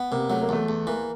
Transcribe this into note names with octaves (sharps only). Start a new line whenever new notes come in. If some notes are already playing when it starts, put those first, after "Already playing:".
Already playing: B3
C3 A#3
F#3 A3
A#3
E2 A3
E2
E3 A#3